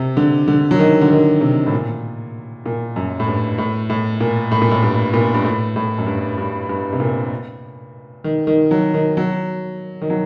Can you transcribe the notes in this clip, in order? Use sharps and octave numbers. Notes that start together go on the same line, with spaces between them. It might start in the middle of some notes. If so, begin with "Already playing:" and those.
Already playing: C3
D3
D3
F#3
D#3
D3
D#3
C3
A2
A#2
A#2
F#2
A2
G2
A2
A2
A#2
A2
A#2
A2
G2
A#2
G2
A2
A2
F#2
G2
G2
G2
C3
A#2
D#3
D#3
F#3
D#3
F#3
D#3
F#3